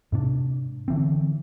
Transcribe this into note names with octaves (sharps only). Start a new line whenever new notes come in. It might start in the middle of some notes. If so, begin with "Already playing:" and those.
G#2 C3 C#4 D4
D3 E3 C4